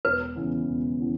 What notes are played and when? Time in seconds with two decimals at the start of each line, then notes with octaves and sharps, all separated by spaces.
0.05 E1 B4
0.36 E2 C#3 E3 B3
0.66 E1
0.99 C#3 E3 B3